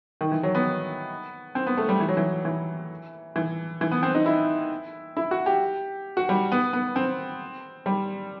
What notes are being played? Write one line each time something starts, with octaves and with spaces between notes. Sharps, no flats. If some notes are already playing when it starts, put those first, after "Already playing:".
D#3
E3
F#3
B3
C4
B3
A3
G3
E3
F#3
E3
E3
E3
E3
B3
C4
D#4
E4
E4
F#4
G4
F#4
G3
B3
B3
C4
G3